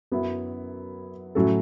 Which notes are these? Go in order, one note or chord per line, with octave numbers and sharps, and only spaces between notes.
F#2 F#3 B3 E4
A2 F#3 C#4 F#4 A4